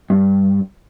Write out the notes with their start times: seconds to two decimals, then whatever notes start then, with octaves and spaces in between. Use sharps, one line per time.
0.10 G2